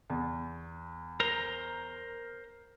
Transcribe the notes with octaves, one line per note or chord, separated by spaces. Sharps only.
E2
A#4 C5 A#5